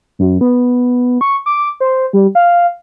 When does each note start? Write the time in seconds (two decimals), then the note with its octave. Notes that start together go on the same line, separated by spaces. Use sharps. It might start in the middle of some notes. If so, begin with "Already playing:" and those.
0.19 F#2
0.41 B3
1.21 C#6
1.46 D6
1.80 C5
2.13 G3
2.35 F5